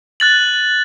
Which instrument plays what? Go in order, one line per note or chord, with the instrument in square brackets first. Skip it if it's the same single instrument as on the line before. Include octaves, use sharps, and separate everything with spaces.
[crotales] F#6 A6 F#7